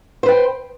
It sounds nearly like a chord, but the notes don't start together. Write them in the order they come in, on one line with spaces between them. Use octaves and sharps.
C5 B4 G5